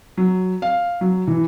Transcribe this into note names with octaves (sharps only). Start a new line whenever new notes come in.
F#3
F5
F#3
E3